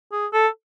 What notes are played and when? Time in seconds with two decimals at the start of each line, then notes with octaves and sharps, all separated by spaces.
0.12 G#4
0.33 A4